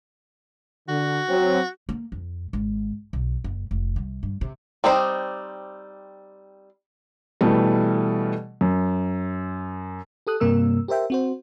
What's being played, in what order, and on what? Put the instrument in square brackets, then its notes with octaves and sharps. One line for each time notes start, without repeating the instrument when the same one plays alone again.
[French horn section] D3 [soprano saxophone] F#4
[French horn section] F#3 C4
[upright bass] A#3
F2
G#1
B1
F#1
F1
C2
G2
C3
[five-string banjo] G3 C4 D#4 C5
[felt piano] B2 E3 G3 A3
F#2
[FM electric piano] G4 A4 D#6 F#6
G2 C3 A#3 A#4 E6
G4 A#4 C5 E5 G5
C4 F#4 C5